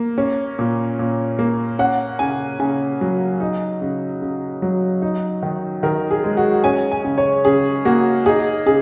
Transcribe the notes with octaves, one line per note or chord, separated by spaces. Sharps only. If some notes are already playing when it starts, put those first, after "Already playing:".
Already playing: A#3
C#4
A#2
A#2
A#3
C#4 F#5
C#3 G#5
C#3 G#5
F#3
D#4
C#3
C#3
F#3
D#4
D#3
D#3 A#4
G#4
G#3
F#4
C#4 G#5
G#5
C#3
C#5
C#3 G#4
A#3 F#4
D#4 G#4
C#3 G#4